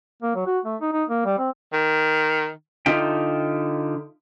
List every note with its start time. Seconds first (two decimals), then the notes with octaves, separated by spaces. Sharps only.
0.22 A#3
0.35 F#3
0.46 F#4
0.65 A3
0.81 D#4
0.93 D#4
1.09 A#3
1.25 G3
1.38 C4
1.73 D#3
2.86 D3 D#4 F4 E5 G5